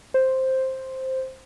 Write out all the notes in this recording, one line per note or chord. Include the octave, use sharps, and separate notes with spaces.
C5